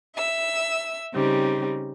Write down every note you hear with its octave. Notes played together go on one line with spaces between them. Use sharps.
E5 E6
C#3 G3 C4 D#4